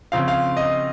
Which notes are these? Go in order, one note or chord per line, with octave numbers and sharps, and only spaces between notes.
C#3 F3 C4 F5
F5
D#5